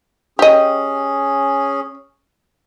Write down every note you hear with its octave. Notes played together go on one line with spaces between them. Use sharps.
C#4 G4 G#4 D#5